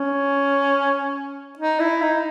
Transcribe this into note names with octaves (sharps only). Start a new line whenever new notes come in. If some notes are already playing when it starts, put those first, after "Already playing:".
Already playing: C#4
D#4
E4
D#4